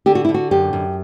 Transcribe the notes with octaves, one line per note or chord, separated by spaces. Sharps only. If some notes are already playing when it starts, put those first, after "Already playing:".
D3 G4
F#4
D3 E4
F#4
F#2 G4
F#2